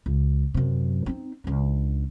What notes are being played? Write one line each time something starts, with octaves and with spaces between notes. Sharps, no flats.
C#2
F#2 C3
C4 D#4
C#2 D4